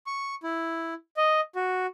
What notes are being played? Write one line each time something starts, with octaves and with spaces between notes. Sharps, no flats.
C#6
E4
D#5
F#4